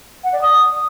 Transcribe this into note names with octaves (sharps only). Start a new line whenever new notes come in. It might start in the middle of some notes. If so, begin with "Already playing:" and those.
F#5
D5
D#6